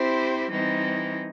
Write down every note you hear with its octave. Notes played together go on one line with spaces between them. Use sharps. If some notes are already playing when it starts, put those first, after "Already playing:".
Already playing: C4 E4 G4 C5
E3 G3 C4 D#4